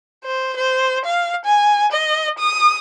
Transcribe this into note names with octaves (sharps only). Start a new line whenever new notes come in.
C5
C5
F5
G#5
D#5
D#6